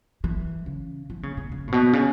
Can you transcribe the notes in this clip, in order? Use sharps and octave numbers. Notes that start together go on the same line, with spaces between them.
E3
C#3
E3
C#3
C#3
C#3
A2
B2
C#3